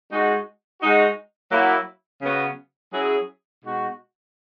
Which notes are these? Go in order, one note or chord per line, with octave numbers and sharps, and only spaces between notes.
G#3 D#4 F#4
G#3 D#4 F#4
F#3 A#3 E4
C#3 F#3 B3 F#4
F#3 C#4 E4 G#4
B2 G#3 D#4 F#4